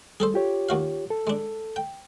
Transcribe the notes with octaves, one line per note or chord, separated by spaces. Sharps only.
G3 G#4 A4 C5
F4 G4 C#5
D#2 F#4 F5
A4
G#3 D4
G5